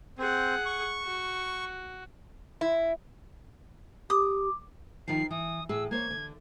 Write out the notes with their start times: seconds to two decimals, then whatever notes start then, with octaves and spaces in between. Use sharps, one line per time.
0.19 C4 G#4 F#5
0.66 C#6
1.03 F#4
2.61 E4
4.10 G4 D6 D#6
5.08 D#3 F3 C7
5.31 E3 D#6
5.69 A2 G#4 E6
5.91 A#3 C5 C#5 G#6
6.10 D3